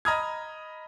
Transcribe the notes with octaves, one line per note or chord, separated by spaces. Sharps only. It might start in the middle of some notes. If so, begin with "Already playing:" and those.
D#5 A#5 B5 D#6 F6 G#6